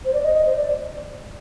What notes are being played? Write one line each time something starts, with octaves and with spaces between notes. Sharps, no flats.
C5
D5
D#5
D#5
C5
D5